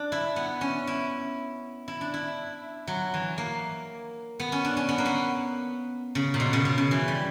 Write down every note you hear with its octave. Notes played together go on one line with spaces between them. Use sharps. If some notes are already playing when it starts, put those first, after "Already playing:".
Already playing: D4
E4
B3
C#4
E4
E4
D4
E4
F#3
E3
A#3
B3
C#4
D4
C#4
B3
A#3
B3
C#3
A#2
B2
C#3
B2
C#3
E3
G3